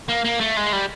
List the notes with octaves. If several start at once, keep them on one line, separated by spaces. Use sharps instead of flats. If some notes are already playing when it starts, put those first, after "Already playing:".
A#3
A#3
A3
G#3
G3